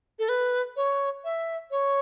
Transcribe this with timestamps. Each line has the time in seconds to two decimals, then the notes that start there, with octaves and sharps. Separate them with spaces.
0.19 A4
0.29 B4
0.76 C#5
1.24 E5
1.71 C#5